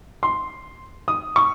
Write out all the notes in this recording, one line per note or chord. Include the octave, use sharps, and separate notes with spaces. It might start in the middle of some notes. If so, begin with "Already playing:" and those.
C6
D#6
C#6